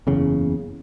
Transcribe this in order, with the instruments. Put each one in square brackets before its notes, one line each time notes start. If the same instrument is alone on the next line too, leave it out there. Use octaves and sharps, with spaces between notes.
[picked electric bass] F#1 E2 C#3